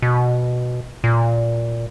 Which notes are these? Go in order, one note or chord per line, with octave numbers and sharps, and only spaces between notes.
B2
A#2